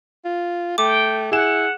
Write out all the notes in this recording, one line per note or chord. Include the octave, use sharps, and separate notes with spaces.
F4
A3 G5 D6
E4 G#4 F#5 E7